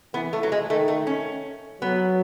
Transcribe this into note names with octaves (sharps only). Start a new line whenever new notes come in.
E3 B3
A3
F#3
G#3
D#3 A3
A3
C#4
F#3 B3